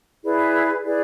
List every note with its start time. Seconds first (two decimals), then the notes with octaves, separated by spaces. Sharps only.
0.23 E4 G#4 B4 D5
0.83 E4 G#4 B4 D5